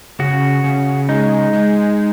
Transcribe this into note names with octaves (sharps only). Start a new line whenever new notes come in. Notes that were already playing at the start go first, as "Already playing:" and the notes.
C#3 F#4
C#3
G#3 D#4
G#3